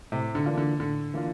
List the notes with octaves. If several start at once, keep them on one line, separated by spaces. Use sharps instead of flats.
A2 C3
D3
E3 A#3 D4 F4
D3
A2 D3
E3 A#3 D4 F4